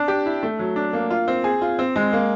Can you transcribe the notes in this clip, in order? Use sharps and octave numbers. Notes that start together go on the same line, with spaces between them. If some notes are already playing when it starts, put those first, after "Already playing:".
Already playing: D4
G4
E4
A3
F#3
D4
A#3
F4
C4
G#4
F4
C4
G#3
A#3